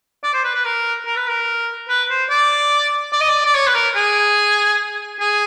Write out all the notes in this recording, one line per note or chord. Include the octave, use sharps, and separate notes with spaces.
D5
C5
B4
B4
A#4
A#4
B4
A#4
B4
C5
D5
D5
D#5
D5
D5
C#5
B4
A#4
G#4
G#4